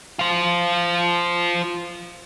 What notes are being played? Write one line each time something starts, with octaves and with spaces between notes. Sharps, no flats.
F4 C5